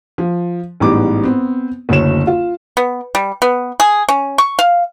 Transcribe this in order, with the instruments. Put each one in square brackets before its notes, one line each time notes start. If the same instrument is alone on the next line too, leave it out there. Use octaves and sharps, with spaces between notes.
[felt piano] F3
A1 G#2 G3 B3 D6
B3 C4
F#1 D2 C#5 E7
F4
[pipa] B3
G3
B3
G#4
C#4
C#6
F5